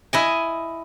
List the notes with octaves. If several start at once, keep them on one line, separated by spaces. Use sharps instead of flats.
E4 D#5 G#5